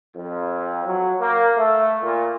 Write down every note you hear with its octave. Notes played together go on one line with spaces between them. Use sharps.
F2
F#3
A#3
A3
A#2